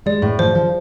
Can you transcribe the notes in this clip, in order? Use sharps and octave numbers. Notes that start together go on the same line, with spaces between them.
G#3 D5
A2
F3 C5
F3